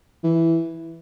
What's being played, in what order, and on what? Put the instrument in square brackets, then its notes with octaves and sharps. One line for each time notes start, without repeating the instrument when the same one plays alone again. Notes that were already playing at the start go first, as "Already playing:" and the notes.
[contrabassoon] E3